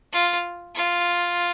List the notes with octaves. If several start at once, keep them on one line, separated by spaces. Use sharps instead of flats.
F4
F4